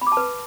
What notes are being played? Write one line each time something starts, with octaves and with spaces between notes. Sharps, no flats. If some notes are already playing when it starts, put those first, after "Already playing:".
B5
D6
A5
B4